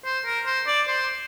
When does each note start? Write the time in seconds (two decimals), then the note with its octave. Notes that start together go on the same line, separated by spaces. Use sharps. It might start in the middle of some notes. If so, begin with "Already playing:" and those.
0.04 C5
0.25 A#4
0.46 C5
0.67 D5
0.88 C5